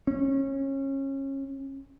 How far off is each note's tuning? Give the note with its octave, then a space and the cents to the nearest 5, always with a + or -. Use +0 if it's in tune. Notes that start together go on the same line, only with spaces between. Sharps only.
C#4 -25